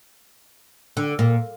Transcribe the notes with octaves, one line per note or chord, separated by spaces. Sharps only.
D3
A#2